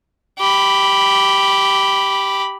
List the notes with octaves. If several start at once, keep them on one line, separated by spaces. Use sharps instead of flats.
G4 B5